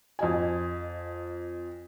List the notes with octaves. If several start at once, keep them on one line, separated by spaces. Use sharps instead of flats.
F2 D#5 G#5